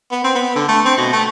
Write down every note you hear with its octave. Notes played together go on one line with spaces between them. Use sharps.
B3
C4
B3
D3
A3
C4
B2
A3